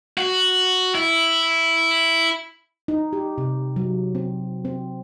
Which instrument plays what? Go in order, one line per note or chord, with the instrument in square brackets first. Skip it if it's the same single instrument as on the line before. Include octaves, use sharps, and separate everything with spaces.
[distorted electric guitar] F#4
E4
[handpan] D#4
G4
C3
F#3
C4
C4